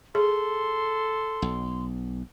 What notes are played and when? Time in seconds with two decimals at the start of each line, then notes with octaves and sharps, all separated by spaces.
0.15 G#4 A4 C6
1.42 B1